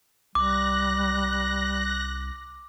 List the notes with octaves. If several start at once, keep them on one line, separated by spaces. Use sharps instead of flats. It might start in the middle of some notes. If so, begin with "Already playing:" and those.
C2 G3 D6 F#6 A#6